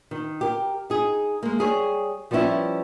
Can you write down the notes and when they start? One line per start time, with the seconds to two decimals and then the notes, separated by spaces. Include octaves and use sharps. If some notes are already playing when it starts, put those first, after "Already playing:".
0.11 D#3
0.41 G4 A#4
0.90 D#4 G#4
1.43 G#3 A#3
1.59 G3 G#4 C#5
2.31 F3 G3 B3 C#4 E4